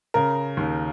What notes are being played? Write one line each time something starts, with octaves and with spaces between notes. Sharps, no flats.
C#3 A#4
D#2